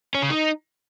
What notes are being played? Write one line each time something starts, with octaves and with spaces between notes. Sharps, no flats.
C#4
C#3
D#4